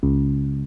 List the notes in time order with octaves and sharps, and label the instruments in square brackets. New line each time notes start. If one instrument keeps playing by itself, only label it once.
[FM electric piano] C#2